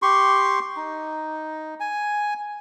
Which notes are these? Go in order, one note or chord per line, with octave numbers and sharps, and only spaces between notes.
G4 C6 C#6
D#4
G#5